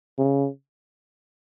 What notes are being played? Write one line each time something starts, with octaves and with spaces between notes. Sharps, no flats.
C#3